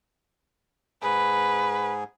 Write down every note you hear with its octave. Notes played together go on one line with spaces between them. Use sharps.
G#2 G#4 B4